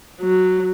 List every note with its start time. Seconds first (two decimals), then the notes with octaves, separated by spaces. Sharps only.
0.21 F#3